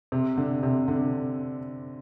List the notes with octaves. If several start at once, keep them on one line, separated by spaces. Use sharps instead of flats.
C3
D3
C3
D3